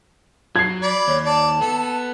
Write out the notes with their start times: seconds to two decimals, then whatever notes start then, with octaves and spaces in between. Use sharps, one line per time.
0.56 F#3 G#6 C7
0.82 D5 B5
1.08 D#2 C#5
1.25 D5 A5
1.61 B3 A4